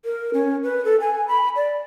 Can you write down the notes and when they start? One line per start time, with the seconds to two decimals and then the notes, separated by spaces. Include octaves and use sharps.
0.05 A#4
0.34 C#4
0.63 B4
0.85 A4
1.00 G#5
1.28 B5
1.56 D5